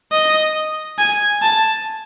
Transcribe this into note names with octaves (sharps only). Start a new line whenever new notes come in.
D#5
G#5
A5